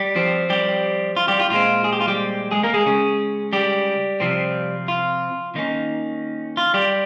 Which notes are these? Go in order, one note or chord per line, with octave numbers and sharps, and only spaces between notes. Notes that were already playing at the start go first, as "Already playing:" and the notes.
Already playing: G3 G4
F3 C4
G3 G4
F4
G3 G4
F4
A#2 G#3 C4 F4
G#4
G4
F4
G3 G4
G#3 G#4
A#3 A#4
G#3 G#4
C#3 G#3 C#4
G3 G4
C3 F3 C4
F4
D#3 A#3 C#4 D#4
F4
G3 G4